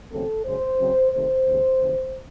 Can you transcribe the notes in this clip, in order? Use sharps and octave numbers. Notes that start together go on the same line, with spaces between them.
D#2 C#3 F#3 A3 C4 A4
F#2 C#3 G#3 C5
C#3 F#3 C4
C3 D#3 A3 C5
D#2 C#3 G#3
D#2 C#3 E3